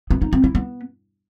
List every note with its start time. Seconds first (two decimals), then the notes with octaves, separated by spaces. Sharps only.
0.11 B3
0.22 D#4
0.33 C4
0.44 E4
0.55 B3